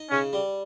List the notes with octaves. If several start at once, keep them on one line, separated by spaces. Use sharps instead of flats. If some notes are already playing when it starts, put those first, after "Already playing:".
Already playing: D#4
C#3 C#4
G3